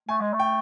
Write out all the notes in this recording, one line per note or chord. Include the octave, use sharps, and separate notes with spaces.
A3 G#5
G#3
A3
G5